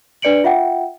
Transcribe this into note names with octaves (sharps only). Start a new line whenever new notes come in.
D4 B4 D5 C#7 D7 F#7
F4 E5 F#5 G5